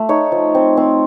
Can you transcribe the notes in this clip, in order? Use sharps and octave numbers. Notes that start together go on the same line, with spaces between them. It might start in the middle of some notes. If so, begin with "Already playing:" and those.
Already playing: A3 F4
D#4 C#5
F3
C4
C4